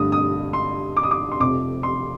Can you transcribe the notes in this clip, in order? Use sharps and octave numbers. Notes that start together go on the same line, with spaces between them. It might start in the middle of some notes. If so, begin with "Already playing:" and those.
Already playing: G2 D3 A3 D#6
D#6
C6
D6
D#6
D6
C6
F1 F2 C3 D6
C6